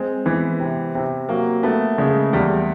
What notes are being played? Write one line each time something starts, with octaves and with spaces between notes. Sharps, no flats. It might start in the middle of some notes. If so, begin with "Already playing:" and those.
Already playing: G#3 C4
E3 B3
C3
C3
F#3 A#3
A3 B3
C#3 G#3
E2 G3